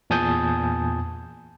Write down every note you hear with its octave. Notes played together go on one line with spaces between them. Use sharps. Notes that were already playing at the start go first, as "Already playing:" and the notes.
E2 A#2 G#5 A5 D#6 G6